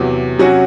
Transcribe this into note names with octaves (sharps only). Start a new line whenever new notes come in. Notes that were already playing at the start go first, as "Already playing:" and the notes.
Already playing: E2 C3 F#3
C3 F#3 C#4 F#4